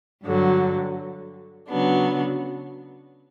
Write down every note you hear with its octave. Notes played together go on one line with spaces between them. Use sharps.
G2 D3 F#3
C#3 F#3 B3 D4